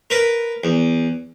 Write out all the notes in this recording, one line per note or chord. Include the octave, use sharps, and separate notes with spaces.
A#4 B4
E2